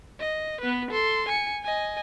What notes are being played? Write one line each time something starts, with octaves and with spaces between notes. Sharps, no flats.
D#5
B3 B4
A4 C6
G#5 C#7
D#5 G#5